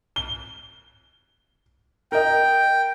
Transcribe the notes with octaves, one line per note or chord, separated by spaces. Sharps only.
G7
A#4 D#5 G5